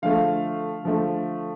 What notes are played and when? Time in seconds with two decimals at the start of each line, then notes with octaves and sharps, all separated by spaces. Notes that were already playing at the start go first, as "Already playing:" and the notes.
0.02 D3 F3 A3 F5
0.84 D3 F3 A3